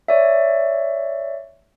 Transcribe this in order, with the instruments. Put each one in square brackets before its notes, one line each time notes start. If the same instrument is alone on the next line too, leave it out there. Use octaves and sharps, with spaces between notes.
[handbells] C#5 D5 E5